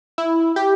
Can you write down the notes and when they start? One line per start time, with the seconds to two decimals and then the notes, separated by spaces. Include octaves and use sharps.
0.18 E4
0.56 G4